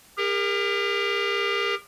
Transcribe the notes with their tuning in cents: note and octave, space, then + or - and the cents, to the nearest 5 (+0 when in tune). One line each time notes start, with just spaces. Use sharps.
G4 +45 A#4 +0